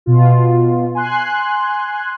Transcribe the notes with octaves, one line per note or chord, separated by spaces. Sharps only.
B2 F4
G#5 C6 F#6